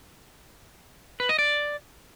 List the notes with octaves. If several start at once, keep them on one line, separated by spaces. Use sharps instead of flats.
B4
D#5
D5